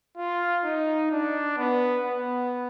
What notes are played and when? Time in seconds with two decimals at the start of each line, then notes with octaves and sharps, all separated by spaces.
0.17 F4
0.65 D#4
1.12 D4
1.58 B3
2.05 B3